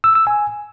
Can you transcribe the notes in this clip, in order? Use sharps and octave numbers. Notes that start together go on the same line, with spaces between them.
E6
E6
G#5